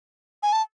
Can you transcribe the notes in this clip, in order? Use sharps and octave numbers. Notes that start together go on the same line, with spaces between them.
G#5
A5